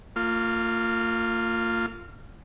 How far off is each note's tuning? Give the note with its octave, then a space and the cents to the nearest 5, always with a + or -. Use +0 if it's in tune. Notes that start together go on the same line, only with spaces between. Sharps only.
A#3 -35 F4 +0